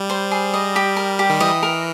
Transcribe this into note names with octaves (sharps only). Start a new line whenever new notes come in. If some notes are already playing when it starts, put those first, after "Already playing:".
Already playing: G3
C5
G#4
D#5
G4
A#4
G4
D#3
E3 D#5
A#4